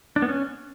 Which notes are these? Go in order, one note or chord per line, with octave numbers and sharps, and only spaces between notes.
D4
B3
C#4